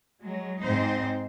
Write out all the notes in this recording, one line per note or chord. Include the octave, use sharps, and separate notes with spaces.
F#3 G#3
G#2 C4 D#4 C5